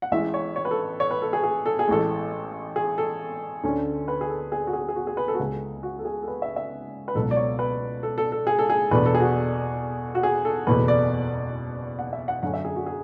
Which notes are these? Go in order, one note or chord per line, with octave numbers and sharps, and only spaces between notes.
F#5
A1 A2 E3 G#3 E5
C#5
C#5
B4
A4
C#5
B4
A4
G#4
G#4
A4
G#4
A1 A2 G#3 A4
G#4
A4
D2 D3 A3 C#4
B4
G#4
A4
G#4
F#4
G#4
G#4
F#4
G#4
B4
A4
F#4
C#2 C#3 G#3 C#4 G#4
F#4
A4
G#4
A4
B4
E5
E5
B4
C#2 B2 F#3 A4
D5
C#5
B4
A4
A4
A4
G#4
A4
G#4
E2 B2 A3 D4 B4
A4
G#4
F#4
F#4
G#4
A4
F#1 E2 B2 A3 B4
D5
F#5
E5
F#5
F#2 D3 A3 C#4 F#5
E5
G#4
F#4
G#4